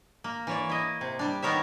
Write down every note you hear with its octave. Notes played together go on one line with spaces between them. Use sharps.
A#3
E3 C#5 D5
E4 D#5
C3
G3 D4
D#3 B3 A#4 C#5 E5